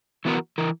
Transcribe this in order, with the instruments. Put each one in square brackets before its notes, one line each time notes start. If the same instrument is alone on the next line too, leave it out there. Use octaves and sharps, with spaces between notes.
[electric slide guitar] E3 B3 F#4 A#4
E3 A#4